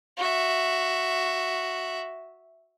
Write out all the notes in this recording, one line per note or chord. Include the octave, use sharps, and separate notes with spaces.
F#4 E5